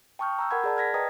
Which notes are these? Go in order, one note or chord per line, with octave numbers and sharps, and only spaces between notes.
G5 A5 C#6 D#6 F6 G6
A#5 E6 G6
A#4 F#5 B5 G#6
G#4 D5 A5
F6 G#6 A#6 B6
B4 D#5 G5 A#5 D#6